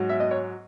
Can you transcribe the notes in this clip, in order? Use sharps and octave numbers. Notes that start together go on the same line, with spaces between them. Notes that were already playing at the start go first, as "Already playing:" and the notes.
Already playing: G#2 F#3
E5
D#5
C#5